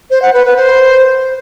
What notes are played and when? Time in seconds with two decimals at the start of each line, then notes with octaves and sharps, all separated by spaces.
0.10 C5
0.22 F#5
0.33 B4
0.45 B4
0.56 C5